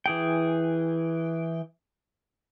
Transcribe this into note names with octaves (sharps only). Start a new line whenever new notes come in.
E3 G#4 G5